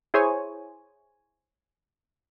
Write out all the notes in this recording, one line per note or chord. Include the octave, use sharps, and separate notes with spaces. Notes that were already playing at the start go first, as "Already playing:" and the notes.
E4 G#4 C5 C#5 G#5